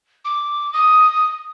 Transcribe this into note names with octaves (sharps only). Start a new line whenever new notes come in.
D6
D#6